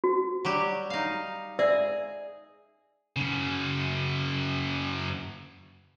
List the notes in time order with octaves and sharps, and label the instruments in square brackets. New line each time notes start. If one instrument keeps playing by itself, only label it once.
[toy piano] F#4
[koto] F#3 G3 G4
D#4 F5
[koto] G#4 [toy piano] D5 E5 E6
[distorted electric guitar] F#2 C#3